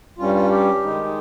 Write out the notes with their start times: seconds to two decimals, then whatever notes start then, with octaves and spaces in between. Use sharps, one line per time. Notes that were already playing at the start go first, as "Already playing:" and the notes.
0.18 G2 G3 C#4 F4
0.34 F4
0.50 G4
0.83 D#3 G#3 D#4